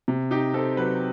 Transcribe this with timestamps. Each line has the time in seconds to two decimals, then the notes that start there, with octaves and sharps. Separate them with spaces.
0.08 C3
0.31 D#4 G4
0.54 C4 A4
0.77 F#3 B4